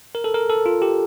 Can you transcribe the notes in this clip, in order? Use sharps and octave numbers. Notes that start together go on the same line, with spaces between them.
A#4
A4
A#4
A4
F4
G4